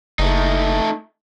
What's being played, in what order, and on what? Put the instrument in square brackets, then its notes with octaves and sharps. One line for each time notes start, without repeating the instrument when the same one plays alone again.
[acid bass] F#1 [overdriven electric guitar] A3 D#4